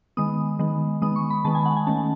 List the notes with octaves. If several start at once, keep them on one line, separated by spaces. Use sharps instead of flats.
D#3 G#3 B3 D#6
D#3 G#3 B3
D#3 G#3 B3 D#6
C#6
B5
D#3 G#3 B3 A5
G#5
F#5
G#5
D#3 A3 C#4 A5